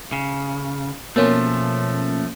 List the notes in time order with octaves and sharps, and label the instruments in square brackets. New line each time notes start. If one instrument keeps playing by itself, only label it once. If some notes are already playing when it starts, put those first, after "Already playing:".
[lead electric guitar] C#3
[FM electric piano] B2 A#3 C#4 [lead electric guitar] F3 A3